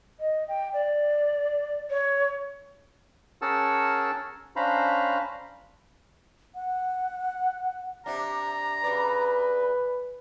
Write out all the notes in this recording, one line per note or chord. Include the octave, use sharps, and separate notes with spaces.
D#5
G5
D5
C#5
C#4 G#4 A#4 F#5 A5 E6
C#4 D4 C5 F5 A#5 B5
F#5
C3 D4 A#5
C#3 B4 D5